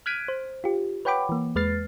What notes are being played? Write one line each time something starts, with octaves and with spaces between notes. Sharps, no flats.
F6 F#6 G#6 B6 D7 D#7
C5
F4 G4
B4 C#5 F#5 G5 B5 D6
E3 A#3
E2 G#3 B4 F6 A6 C7